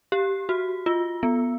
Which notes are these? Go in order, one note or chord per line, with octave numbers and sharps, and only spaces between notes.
G4
F#4
F4
B3